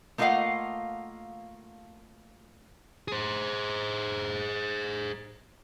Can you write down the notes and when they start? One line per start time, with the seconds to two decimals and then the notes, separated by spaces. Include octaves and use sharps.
0.18 A3 A#3 F4 D#5 F5 F#5
3.08 G#4 C5